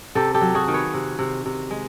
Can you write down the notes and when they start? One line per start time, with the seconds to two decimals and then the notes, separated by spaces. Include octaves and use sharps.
0.15 C3 G4 A4
0.34 G4 A4
0.41 F#3
0.55 F#4 G#4
0.68 D#3
0.74 B4 C#5
0.94 C3
1.19 C3
1.46 C3
1.71 G#3